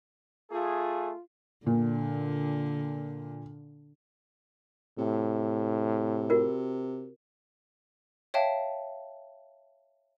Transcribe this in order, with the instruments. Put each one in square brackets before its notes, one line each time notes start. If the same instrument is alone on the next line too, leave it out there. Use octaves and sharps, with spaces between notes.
[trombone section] A3 G#4 [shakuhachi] F4
[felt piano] A#2 [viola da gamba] D3
[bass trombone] A2 [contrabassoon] C3
[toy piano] F4 F#4 A#4
[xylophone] C#5 E5 F5 G5 A5